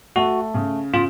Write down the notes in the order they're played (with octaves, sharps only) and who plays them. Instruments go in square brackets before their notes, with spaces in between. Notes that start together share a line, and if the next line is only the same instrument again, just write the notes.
[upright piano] A3 [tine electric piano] F#4
[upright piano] C#3
[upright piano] C#3 [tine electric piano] F4